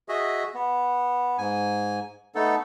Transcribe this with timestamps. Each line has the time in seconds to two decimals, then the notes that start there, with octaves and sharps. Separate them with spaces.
0.09 F#4 G#4 D#5 E5
0.54 B3
1.38 G#2 G#5
2.35 A3 B3 D#4 A4